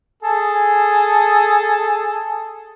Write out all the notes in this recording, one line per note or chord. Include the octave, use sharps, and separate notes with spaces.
G#4 A4